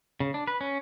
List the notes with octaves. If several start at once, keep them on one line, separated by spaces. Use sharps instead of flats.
C#3
D4
B4
C#4